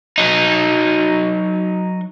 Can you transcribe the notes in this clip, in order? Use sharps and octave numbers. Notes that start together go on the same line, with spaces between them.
F#3 D#4